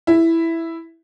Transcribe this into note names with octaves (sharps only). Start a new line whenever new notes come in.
E4